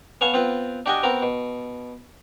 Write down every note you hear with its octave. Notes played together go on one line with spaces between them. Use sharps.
B3 C#5 F5 G#5 A5
B3 C4 F4 B4
D4 F#4 G4 D5 D#5 G#5
B3 C4 F#4 A#4
B2